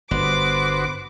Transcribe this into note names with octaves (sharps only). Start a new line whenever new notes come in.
G1 B3 F#4 C5 D6